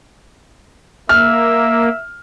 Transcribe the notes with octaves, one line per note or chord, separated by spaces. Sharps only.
A#3 E5 F6